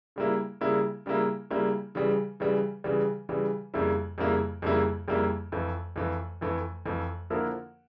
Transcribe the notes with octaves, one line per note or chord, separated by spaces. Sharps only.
C#3 G3 A#3 E4
C#3 G3 A#3 E4
C#3 G3 A#3 E4
C#3 G3 A#3 E4
C#3 E3 G3
C#3 E3 G3
C#3 E3 G3
C#3 E3 G3
F2 C#3 G3 A#3 E4
F2 C#3 G3 A#3 E4
F2 C#3 G3 A#3 E4
F2 C#3 G3 A#3 E4
F2 E3 A3
F2 E3 A3
F2 E3 A3
F2 E3 A3
D3 F3 A#3 E4 A#4